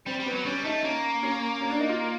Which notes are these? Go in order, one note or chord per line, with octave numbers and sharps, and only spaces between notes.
G3 C4
G3
B3
F#3
G3 C#4
A3 D#4
A#3 C#4
C#4
C#4
D4
D#4
F4